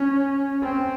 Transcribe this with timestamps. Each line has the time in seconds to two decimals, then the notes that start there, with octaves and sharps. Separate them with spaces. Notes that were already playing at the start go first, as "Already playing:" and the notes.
Already playing: C#4
0.63 C4